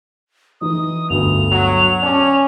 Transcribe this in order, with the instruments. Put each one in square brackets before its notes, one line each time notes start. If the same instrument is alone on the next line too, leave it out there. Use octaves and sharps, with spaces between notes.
[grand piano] E3 D#4 [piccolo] D#6
[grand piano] G1 D2 D3 [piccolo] F7
[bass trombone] F#3
[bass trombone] C#4 [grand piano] D5 A5 D6